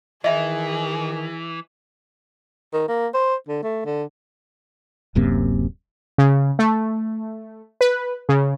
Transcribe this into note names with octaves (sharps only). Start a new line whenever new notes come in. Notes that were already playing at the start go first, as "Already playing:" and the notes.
D#3 E3 G#4 D#5 E5 F#5
D#3
A#3
C5
D3
A3
D3
D1 F#2 C3 A#3
C#3
A3
B4
C#3